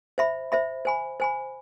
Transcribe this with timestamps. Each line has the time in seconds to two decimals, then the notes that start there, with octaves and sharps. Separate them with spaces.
0.18 C5 E5 B5
0.52 C5 E5 B5
0.85 C5 G#5 B5
1.20 C5 G#5 B5